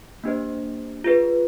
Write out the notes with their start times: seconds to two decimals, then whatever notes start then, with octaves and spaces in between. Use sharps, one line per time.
0.24 A#3 D4 G4 C5 D#5
1.04 F4 G#4 B4